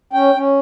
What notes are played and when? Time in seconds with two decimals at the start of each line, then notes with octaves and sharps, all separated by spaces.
0.13 C#4 G5
0.34 C#4